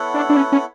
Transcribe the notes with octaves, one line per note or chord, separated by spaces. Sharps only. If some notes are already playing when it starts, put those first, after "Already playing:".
Already playing: B3 E4 A4 C#5 F#5
D4
D4
C#4
C#4